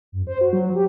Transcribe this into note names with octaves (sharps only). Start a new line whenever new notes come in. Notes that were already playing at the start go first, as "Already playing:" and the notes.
F#2
C5
F#4
F#3
G4